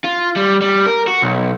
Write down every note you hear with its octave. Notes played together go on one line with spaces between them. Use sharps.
F4
G3
G3
A#4
F#4
B1